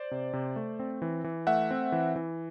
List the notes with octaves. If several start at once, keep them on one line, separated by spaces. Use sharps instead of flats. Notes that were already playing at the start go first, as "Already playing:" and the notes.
Already playing: C5 D5
C3
C3
A3
C4
E3
E3
A3 E5 F#5
C4
E3
E3